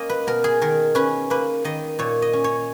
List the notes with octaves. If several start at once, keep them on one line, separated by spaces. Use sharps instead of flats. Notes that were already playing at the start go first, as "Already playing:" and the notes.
Already playing: A#3 C#4 D#5
B4
B2 A#4
G#4
D#3 A#4
C#4 B4
A#3 B4
D#3 D#5
A#2 C#5
D#5
C#4
C#5